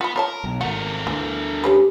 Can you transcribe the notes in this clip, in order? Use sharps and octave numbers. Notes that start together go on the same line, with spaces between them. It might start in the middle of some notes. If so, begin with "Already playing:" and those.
B3 F4 B5
F4 A#4 C#5 A5
B1
D#1 G#1 A3 F#4 A#4
D2 E3
D#3 C#4 G4 B4